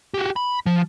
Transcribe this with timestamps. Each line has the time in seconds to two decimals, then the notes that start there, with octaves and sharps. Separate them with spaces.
0.14 F#4 G4
0.36 B5
0.66 F3